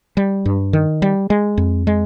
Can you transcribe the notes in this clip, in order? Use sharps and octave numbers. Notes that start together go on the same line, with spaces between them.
G3
G2
D#3
G3
G#3
F2
G#3